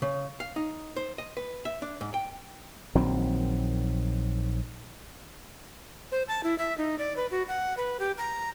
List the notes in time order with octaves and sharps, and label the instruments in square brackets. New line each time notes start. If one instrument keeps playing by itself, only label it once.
[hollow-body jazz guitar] C#3
F5
D#4
C5
D#5
B4
E5
D4
G#2
G5
[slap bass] A#1 D#3 F#3 C4
[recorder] C5
A5
E4
E5
D#4
D5
B4
F#4
F#5
B4
G4
A#5